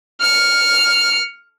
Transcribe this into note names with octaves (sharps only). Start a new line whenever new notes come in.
F6 C#7